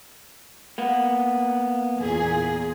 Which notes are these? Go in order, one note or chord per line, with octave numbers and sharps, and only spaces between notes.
A#3 B3
E2 A#2 G#4